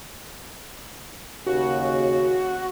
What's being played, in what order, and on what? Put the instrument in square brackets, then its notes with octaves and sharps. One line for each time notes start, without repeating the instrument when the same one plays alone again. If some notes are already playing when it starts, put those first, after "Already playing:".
[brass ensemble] D#2 C#3 [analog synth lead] F#4